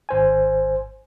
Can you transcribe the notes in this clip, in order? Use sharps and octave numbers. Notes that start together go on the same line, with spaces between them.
G#1 C5 G#5